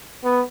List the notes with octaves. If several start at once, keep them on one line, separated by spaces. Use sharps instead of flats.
B3